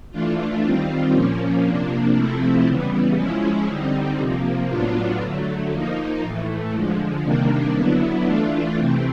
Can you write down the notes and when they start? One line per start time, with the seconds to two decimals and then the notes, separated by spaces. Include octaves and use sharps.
0.11 E3 A3 D4 F4
0.62 D#3 G3 C4 F4
1.13 A#2 F3 A#3 C#4
1.64 C3 F3 A#3 D4
2.15 C3 F3 A3 C4 E4
2.66 C#3 E3 G3 B3
3.16 F3 G#3 C#4 E4
3.67 D3 G3 C4 D#4
4.19 C3 F3 A#3
4.69 A2 F#3 B3 D4 F4
5.20 D3 F#3 A3
5.71 F3 A#3 D#4
6.22 A2 E3 A3
6.73 D3 F3 G#3
7.23 C3 D#3 G3 A#3 D4
7.74 D3 F#3 B3 E4
8.25 E3 A3 D4 F4
8.77 C3 E3 A3 C4